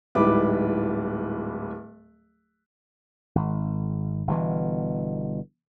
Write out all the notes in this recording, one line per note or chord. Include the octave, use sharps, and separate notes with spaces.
D1 G#2 G3 E4 B4 D6
G#1
G1 B2 E3